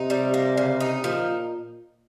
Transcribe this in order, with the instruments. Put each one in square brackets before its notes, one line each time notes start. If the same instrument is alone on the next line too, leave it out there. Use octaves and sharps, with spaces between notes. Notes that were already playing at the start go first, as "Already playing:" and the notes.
Already playing: [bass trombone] C3 [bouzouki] D#4
[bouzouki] G3
A#3
C#3
D#4
[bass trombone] A#2 [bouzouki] F3